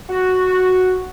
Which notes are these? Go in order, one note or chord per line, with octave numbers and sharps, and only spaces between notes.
F#4